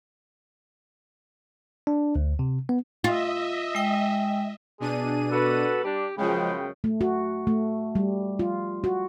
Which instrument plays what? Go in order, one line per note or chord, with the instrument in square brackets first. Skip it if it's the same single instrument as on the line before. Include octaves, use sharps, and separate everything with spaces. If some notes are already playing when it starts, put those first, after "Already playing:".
[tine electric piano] D4
D2
C3
B3
[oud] F4 [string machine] D#5 E5
[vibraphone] G#3 G5
[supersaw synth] B2 D4 D#7 [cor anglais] G#4
[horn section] F#4 B4 [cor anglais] A4
[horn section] G3 D4 [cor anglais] G4
[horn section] F#2 C#3 G5 [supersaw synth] F3 G#3 [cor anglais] B3
[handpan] A3
F#4
A3
G3
F4
F#4